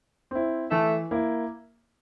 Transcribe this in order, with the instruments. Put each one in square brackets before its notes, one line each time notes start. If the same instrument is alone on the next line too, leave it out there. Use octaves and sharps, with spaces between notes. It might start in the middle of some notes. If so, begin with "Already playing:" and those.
[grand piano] C4 E4
[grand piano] E3 [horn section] A3
[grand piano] A#3 E4